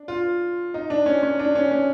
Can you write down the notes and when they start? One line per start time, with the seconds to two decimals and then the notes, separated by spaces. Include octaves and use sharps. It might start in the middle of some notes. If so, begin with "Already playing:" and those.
Already playing: D4
0.08 F4
0.74 D#4
0.90 D4
1.06 C#4
1.23 C#4
1.39 D4
1.55 C#4
1.71 C#4